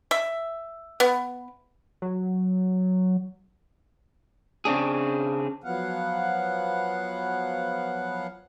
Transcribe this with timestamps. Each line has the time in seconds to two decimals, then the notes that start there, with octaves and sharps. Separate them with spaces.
0.11 E5
1.00 B3
2.02 F#3
4.65 C#3 C4 D4 G#4
5.64 F3 F#3 B3 F5 F#5